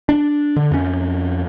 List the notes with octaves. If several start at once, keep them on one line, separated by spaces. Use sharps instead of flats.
D4
D3
F2 C#4